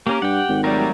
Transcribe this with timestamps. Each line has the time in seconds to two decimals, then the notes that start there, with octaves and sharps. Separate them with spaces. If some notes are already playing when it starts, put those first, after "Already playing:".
0.07 A#3 C#4 G4 A#4
0.22 G2 F#5 G5
0.49 G#1
0.64 F#3 G3 A3 A#4